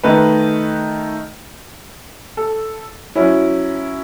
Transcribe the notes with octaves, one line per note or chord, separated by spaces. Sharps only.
D#3 A3 D#4 B4
A4
F#3 C#4 E4